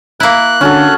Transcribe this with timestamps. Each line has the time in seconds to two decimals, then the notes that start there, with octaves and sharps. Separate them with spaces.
0.20 A#3 E4 F#6
0.61 D3 C#4 F#4 A4